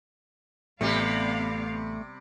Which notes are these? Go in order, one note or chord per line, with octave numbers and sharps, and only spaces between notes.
A1 C3 G3 A3 B3 G4 D5 F5